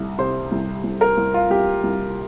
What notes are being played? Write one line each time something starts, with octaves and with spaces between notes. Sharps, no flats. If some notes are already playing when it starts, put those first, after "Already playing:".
Already playing: C2
C3 C5
C2
C2
A#4
C2
F4
C2 G4
C2